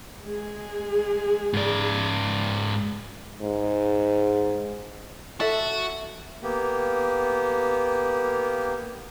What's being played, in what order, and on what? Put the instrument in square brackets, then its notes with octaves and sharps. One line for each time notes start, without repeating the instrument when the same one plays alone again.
[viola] G#3 G#4
[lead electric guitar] G#2 D5
[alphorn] G#2
[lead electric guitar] F#4 [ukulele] A4 E5
[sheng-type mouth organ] A#3 B3 G4